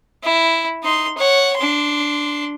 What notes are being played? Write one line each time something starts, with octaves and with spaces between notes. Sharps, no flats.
E4
D#4 C6
C#5 F#5
D4 C6